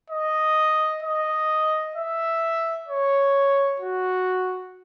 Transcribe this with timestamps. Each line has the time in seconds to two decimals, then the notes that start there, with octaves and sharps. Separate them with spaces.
0.10 D#5
1.03 D#5
1.96 E5
2.88 C#5
3.80 F#4